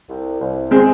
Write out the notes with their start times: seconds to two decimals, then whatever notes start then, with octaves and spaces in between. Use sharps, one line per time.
0.09 C2
0.41 C2
0.71 G#3 C4 G#4